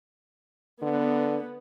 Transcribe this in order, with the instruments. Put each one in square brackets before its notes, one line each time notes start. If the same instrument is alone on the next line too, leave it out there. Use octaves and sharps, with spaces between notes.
[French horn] D3 [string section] B3